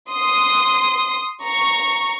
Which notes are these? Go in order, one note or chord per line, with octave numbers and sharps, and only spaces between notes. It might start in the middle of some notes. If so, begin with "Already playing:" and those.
C6 D#6
A#5 C#6